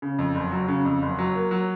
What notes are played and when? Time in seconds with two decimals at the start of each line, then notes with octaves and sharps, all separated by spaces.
0.02 C#3
0.19 F2
0.35 F#1
0.52 F#3
0.68 C#3
0.85 F2
1.02 F#1
1.19 F#3
1.35 A#3
1.51 F#3